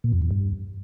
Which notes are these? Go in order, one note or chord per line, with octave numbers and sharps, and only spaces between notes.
A#2
F2
E2
G2